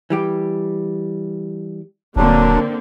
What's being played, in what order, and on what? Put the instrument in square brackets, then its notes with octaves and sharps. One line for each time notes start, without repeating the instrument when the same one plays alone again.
[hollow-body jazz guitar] E3 G3 G4
[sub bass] D#1 [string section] D3 A#3 C4 [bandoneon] F#3 D4